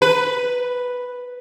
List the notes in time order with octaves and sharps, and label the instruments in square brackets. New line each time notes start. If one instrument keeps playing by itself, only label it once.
[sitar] B4